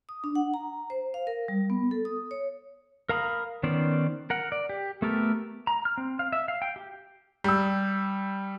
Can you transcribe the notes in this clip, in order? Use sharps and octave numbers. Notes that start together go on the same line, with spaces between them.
D#6
D4
F#5
A#5
C5
F5
A#4
G3
B3
A4
D#6
C#5
A#4 F5 A#5 B5 D#6
D#3 B3 C#4 C5 D5
A#4 F#5
D5
G4
A3 B3 G4 A4 A#4
A#5
F6
C4
F5
E5
F5
G5
G4
G3 E6